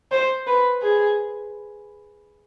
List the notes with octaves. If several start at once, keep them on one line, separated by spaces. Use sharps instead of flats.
C5
B4
G#4